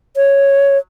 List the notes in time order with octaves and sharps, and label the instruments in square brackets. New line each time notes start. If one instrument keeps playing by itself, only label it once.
[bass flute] C#5